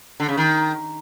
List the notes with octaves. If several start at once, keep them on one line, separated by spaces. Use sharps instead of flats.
D3
C#3
D#3